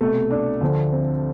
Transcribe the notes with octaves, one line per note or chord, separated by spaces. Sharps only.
C2 B2 A3 A4
D4
D2 D3 F3
C4